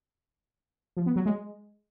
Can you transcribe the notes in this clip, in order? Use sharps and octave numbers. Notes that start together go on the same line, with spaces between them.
F3
B3
F#3
G#3